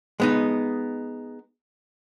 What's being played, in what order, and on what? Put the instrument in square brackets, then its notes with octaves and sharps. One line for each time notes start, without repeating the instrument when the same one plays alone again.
[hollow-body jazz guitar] G#3 B3 D#4